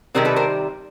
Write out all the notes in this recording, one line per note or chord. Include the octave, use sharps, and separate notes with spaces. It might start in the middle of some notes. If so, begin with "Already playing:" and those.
C3 D#3 G3 C4 G#4 A#4
A4 B4
A#4 C5